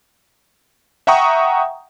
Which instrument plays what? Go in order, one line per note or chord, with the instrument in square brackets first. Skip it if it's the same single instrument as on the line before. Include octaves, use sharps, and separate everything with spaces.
[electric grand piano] E5 F#5 G5 A#5 C#6 D#6